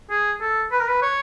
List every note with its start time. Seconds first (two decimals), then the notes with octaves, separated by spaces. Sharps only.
0.10 G#4
0.41 A4
0.72 B4
0.80 A#4
0.88 B4
1.02 C#5